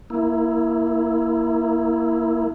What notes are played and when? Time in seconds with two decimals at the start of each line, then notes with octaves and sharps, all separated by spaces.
0.10 A#3 E4